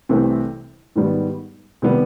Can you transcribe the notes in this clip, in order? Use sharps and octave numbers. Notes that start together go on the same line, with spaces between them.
C2 C3 E3 A3 C4
G#2 D#3 G3 B3
C3 D#3 G3 B3